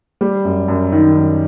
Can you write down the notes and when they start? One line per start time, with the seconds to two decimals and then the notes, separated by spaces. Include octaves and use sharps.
0.21 G3
0.45 F#2
0.68 F#2
0.92 D#3
1.17 F#2